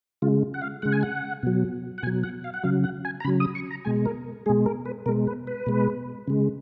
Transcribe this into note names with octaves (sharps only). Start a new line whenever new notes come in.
C#3 G#3 F4
F#5
F5
C#3 G#3 F#5
G#5
F#5
B2 F#3
F#5
B2 F#3 G#5
F#5
F5
F#5
C#3 F#3 F5
F#5
G#5
A#5
C#3 F#3 B5
D#6
C#6
A#5
B2 G#3 G#5
A#4
B2 G#3 G#4
A#4
B4
B2 G#3 A#4
B4
B4
B2 G#3
C#3 G#3